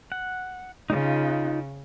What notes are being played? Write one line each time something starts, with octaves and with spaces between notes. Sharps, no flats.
F#5
C#3 D#4 F4